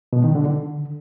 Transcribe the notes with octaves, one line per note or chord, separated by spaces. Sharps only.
B2
D#3
D3
D3